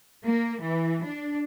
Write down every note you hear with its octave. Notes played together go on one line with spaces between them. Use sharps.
A#3
E3
D4